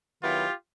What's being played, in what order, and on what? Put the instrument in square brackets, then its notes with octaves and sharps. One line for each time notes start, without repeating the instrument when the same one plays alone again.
[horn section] D#3 F#3 B3 E4 F4 G4